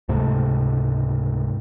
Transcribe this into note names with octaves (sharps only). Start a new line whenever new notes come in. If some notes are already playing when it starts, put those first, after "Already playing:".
C#2 G#2 C3 A3